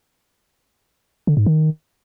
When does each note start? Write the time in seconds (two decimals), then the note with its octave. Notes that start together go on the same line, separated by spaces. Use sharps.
1.27 D3
1.37 G#2
1.46 D#3